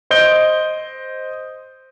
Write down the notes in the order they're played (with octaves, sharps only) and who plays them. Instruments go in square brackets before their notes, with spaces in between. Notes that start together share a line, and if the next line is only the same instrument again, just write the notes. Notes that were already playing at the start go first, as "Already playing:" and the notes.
[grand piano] C5 D#5 G6 D7 G7